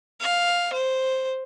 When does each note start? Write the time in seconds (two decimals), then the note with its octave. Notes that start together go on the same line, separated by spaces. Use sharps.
0.20 F5
0.73 C5